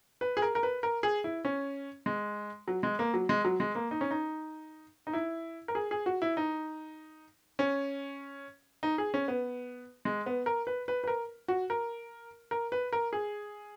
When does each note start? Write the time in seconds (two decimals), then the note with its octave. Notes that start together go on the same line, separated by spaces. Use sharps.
0.21 B4
0.37 G#4
0.42 A#4
0.55 A#4
0.63 B4
0.83 A#4
1.03 G#4
1.24 E4
1.45 C#4
2.06 G#3
2.68 F#3
2.83 G#3
2.99 A#3
3.14 F#3
3.29 G#3
3.45 F#3
3.60 G#3
3.75 A#3
3.91 D#4
4.01 C#4
4.11 D#4
5.07 D#4
5.13 E4
5.68 A#4
5.75 G#4
5.91 G#4
6.06 F#4
6.22 E4
6.37 D#4
7.59 C#4
8.83 D#4
8.98 G#4
9.14 C#4
9.28 B3
10.05 G#3
10.26 B3
10.46 A#4
10.67 B4
10.88 B4
11.04 B4
11.07 A#4
11.48 F#4
11.70 A#4
12.51 A#4
12.72 B4
12.93 A#4
13.13 G#4